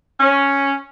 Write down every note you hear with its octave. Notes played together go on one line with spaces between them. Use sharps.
C#4